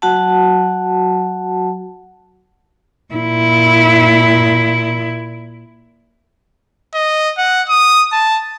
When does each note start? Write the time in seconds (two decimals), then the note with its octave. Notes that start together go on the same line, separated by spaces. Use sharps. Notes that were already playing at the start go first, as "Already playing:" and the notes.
0.02 F#3 F#4 F#5 A5
3.14 A#2 E4
6.94 D#5
7.38 F#5
7.69 D#6
8.12 A5